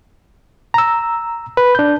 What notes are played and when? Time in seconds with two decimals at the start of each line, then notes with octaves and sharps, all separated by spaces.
0.74 A#5 E6
1.57 B4
1.75 D4 G6